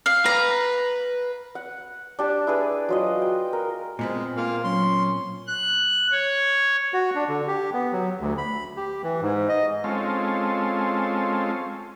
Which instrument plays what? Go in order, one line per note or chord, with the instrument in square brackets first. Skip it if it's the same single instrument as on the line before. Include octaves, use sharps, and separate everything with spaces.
[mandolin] F5
[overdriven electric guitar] B4 [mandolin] A#5
[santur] F#5
D4 G4 A5
E4 G#4 B4
F#3 F4 D#5
G5
A#4
[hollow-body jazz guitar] A#2 B3 C4 [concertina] G#3 [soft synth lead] F6
[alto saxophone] A#3 [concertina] F4 F5
[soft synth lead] F#3 [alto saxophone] C#4 [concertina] C6
[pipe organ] F#6
C#5
[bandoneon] F#4
D4
D3
G4
B3
F#3
D2
B5
G4
E3
G#2
D#5
[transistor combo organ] G#3 C4 C#4 F4 A4